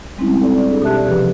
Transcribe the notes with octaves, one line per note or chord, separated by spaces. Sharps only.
G3 G#3 C4 C#4 D#4 E4
C4 A4 D5
D4 G#4 A4
B2 G4 D5 E5 A5 F#6
C3 E3 F3 G4 G#4 B4